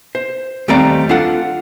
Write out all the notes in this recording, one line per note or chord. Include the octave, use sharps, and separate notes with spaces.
C5
D#2 G3 A3 C4 D5 A#5
D4 F4 A4 F#5